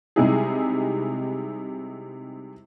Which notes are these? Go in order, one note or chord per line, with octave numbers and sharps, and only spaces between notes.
C3 G3 G#3 D#4 E4 G#4